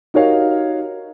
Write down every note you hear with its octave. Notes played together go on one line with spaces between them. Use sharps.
D#4 F#4 G4 A#4 C#5 F5